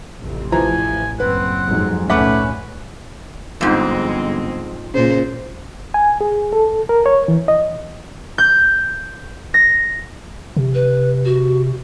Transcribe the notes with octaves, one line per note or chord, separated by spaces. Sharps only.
A1 F2 C3
E3 F3 G#5 A#5
F#1 C4 B4 F#5
F2 G#2 F#3
C#2 A#2 A3 C#4 B4 F#5 D6
G1 F2 G#2 G#3 C4 D#5
A#2 C#3 C5
G#5
G#4
A4
A#4
C#5
E3
D#5
G6
A#6
C3
B4
F#4